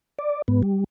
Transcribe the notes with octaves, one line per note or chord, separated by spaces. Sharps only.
D5
G#2 B3
G3